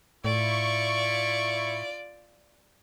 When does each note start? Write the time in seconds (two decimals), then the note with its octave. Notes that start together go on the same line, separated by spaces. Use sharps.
0.24 A2 E4 F4 D5 C#6